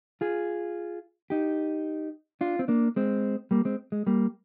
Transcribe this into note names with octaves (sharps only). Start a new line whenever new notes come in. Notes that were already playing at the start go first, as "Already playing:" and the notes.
F4 G#4
D#4 G4
D4 F4
C4
A#3 D4
G#3 C4
G3 A#3
G#3 C4
G#3
G3 A#3